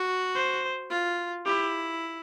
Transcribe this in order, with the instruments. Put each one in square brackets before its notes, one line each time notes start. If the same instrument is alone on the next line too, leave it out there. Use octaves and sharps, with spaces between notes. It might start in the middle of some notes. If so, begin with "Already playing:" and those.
Already playing: [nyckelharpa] F#4
[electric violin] C5
[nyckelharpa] F4
[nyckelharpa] E4 [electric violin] G4